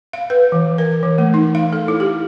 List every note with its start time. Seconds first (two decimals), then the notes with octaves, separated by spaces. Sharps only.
0.13 F5
0.30 B4
0.52 E3
0.78 A#4
1.03 E3
1.18 A3
1.34 D#4
1.55 F5
1.73 A4
1.88 E4
2.00 G4